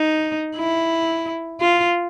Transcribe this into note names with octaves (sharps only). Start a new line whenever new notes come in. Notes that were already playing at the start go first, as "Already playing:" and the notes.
Already playing: D#4
E4
F4